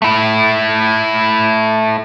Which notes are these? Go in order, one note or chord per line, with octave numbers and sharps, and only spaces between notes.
A3 E4